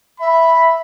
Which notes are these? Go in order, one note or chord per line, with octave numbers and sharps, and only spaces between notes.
E5 B5